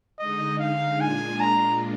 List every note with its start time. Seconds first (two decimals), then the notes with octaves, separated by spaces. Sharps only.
0.19 D3 G#3 D#4 D#5
0.59 F5
1.00 A#2 G#3 D4 F4 G#5
1.40 A#5